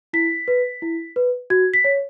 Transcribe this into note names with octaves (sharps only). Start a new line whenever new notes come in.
E4 B6
B4
E4
B4
F#4 G#6
B6
C#5